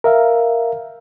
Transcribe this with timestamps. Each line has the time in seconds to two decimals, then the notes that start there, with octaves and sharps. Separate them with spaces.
0.04 A#4 E5 F5